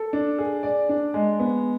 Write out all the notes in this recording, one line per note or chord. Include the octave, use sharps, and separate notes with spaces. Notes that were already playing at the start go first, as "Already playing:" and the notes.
Already playing: A4
D4
G#4
D5
D4
G#3
B3